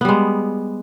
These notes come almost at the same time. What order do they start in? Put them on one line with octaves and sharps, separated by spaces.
B3 G3 G#3